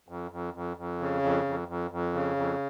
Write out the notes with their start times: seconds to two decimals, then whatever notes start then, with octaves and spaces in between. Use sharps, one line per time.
0.09 F2
0.31 F2
0.54 F2
0.77 F2
1.00 C#3
1.22 F2
1.45 F2
1.68 F2
1.91 F2
2.13 C#3
2.36 F2